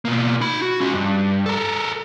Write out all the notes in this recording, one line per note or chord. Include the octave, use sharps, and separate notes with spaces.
B2 A#3
D#4 B5
F#4
C#4 F4
G2
A4 A#4